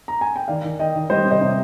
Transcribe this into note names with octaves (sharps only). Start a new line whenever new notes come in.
A#5
G#5
G5
D#3 D5 F5
D#3
D#3 D#5 G5
D#3
G3 C5 D#5
C3
C5 D#5
C3